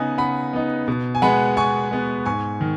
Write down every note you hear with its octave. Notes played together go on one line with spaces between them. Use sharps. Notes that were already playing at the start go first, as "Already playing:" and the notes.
Already playing: C#3 B3 D#4 B4 D#5 G#5
C#3 F#5 B5
B3 D#4
B2
G#5
G#3 B3 F#5 B5
B2 G#5 C#6
G#3 B3
G#2 G#5 C#6
D#3